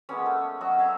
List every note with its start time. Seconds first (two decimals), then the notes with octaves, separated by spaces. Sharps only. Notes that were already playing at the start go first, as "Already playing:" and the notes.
0.09 G#3 A#3 B3 C#4
0.26 A3
0.61 F#3 F#4 D#5 C#6
0.78 E5 F5 G#5 A#5